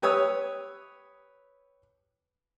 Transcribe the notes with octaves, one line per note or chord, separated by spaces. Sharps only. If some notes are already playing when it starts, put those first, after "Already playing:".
G4 B4 C#5 D#6 E6